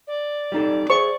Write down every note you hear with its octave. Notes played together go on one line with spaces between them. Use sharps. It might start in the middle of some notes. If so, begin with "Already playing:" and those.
D5
G3 D#4 A4
G#4 C5 E5 C#6